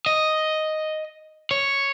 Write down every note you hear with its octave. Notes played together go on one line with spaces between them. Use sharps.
D#5
C#5